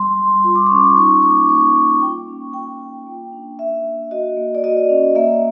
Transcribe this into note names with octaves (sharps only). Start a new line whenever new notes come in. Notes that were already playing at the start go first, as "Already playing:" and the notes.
Already playing: G3 C6
G3
F4
D6
C#4 C#6
D6
D#4 C#6
A#3 D6
A#3 C#6
A#3
A#3 G5
C#4
F4 G5
F4
A#3
D4
A#3 E5
A#3
F#4 D#5
A#3
D5
F#4 D#5
C#4
A#3 E5